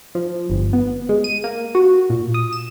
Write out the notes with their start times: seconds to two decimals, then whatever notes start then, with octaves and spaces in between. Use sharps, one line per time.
0.15 F3
0.50 G1
0.73 B3
1.09 G#3
1.24 D#7
1.44 A#3
1.75 F#4
2.10 A#2
2.34 D#6
2.53 E7